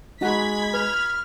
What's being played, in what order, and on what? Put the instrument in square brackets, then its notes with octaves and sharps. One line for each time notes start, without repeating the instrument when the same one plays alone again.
[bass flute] G#3 [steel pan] D#4 F#4 F#5 [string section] B5 G#6 B6
[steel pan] B4 [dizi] F6